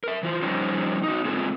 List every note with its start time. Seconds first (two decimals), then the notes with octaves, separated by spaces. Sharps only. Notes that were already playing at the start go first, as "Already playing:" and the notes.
0.04 A#4 E5
0.23 E3 F4 C5
0.42 F3 G3 C#4 D#4 C5 C#5
1.04 D#4 F#4
1.25 G#3 C4 F4 G#4 A4